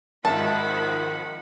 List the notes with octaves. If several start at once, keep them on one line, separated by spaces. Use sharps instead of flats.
G#1 D#3 F3 E5 F#5 A5 B5